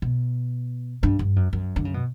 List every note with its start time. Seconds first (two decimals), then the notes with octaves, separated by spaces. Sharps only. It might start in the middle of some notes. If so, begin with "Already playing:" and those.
0.02 B2
1.03 G2
1.19 G2
1.36 F#2
1.53 F#2
1.76 D3
1.85 C#3
1.94 B2